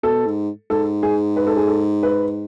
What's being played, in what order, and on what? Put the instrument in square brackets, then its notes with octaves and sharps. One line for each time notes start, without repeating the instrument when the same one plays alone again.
[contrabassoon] B2 [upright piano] A4
[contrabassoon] G#2
[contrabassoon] G#2 [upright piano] A4
[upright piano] G#4
B4
A4
G#4
A4
B4